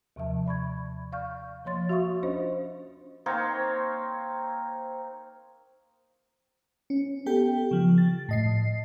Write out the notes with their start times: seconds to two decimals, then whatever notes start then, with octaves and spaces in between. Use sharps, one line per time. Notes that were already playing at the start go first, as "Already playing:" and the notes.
0.16 D#2 C3 F3 E5 A5
0.46 D5 B5 C#6 G#6
1.12 D5 F5 C#6 F6 G6
1.65 F3 A#3 C#5 C6 A6
1.89 F#4 E5 F5 C#6 D#6
2.23 C#4 D4 F4 C5 D#5
3.26 A#3 C4 D#4 C#5
6.90 C#4
7.26 B3 G4 A4 G5
7.71 C#3 F3
7.98 A6
8.29 A2 D#5 C7